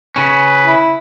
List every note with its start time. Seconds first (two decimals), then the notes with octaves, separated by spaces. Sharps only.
0.16 C#3 C#4 B4
0.65 E4